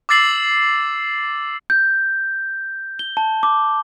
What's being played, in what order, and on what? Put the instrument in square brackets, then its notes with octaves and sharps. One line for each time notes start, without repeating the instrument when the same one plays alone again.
[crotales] D6 E6 A6 C7 F#7
[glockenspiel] G6
G7
A5
D6